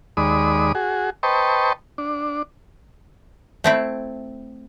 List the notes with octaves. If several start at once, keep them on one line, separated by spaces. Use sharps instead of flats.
D#2 G#3 D5 B5 D#6
F#4 G#4
B4 C5 D#5 G5 A5 C#6
D4
A3 C4 E4